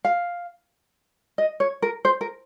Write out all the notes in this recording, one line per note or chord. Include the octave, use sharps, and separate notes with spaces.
F5
D#5
C#5
A#4
C5
A#4